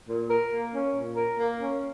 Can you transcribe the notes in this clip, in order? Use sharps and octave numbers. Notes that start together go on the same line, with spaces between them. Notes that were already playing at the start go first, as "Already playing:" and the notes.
A#2
A#4
A#3
C#4
A#2
A#4
A#3
C#4